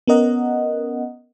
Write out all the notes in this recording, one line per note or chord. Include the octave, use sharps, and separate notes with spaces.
B3 C#4 A#4 D#5 F#5